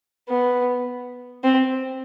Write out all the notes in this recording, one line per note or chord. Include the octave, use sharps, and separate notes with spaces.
B3
C4